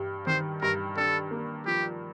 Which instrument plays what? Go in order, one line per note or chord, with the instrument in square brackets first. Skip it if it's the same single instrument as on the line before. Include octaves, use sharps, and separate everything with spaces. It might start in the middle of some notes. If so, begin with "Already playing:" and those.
Already playing: [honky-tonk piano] G2 G3
[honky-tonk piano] D#3 [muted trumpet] C5
[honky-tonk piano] G2 [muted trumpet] A#4
[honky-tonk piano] D4 [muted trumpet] A4
[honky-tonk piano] A#3
[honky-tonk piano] F3 [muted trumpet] G4